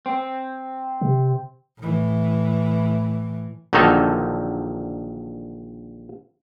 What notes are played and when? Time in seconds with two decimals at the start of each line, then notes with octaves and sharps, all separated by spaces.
0.06 C4
1.01 C3
1.79 A2 E3
3.73 A#1 D3 D#3 F#3 D#4 A4